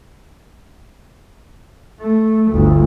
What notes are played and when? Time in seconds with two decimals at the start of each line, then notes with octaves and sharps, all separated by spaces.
2.00 A3
2.51 G1 D2